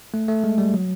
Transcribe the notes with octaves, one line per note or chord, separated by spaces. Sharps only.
A3
A3
G#3
G3
F#3